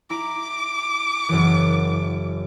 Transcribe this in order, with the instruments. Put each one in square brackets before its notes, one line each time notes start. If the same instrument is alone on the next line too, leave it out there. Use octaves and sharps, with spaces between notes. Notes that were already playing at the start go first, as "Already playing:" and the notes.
[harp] E4 A#5 D7 [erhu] D6
[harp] F#1 F#2 E3